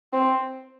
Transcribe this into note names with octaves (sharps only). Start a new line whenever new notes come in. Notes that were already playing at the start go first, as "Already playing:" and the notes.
C4